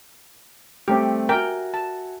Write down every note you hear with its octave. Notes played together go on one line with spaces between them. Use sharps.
G3 A3 C4 G4
F#4 A#4 E5 G5 G#5
A5